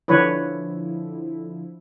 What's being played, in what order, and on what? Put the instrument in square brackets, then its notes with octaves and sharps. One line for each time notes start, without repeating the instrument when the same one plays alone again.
[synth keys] D3 F3 E4 [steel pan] D4 B4 C#5